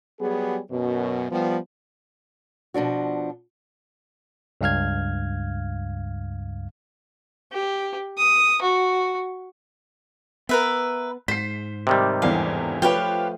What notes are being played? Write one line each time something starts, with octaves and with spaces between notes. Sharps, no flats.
F#3 G3 B3 G4 G#4
F#2 B2
F3 G3 B3
B2 F3 D4 F#4
C#2 G2 F5 F6 G#6
G4
D#6
F#4
B3 A#4 B4 E5
G#2 C5 B6 C7
C3 D#3 G3
G1 E2 E3 F5
F3 A3 F4 G4 B4 C#5 G5